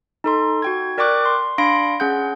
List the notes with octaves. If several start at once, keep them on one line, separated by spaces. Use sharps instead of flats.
D#4 A4 C6
F#4 G5 G#6
A#4 D5 G5 C#6 D6 F#6
C6
D4 F5 B5 C6 A#6 D7
C#4 G#4 F#5 G6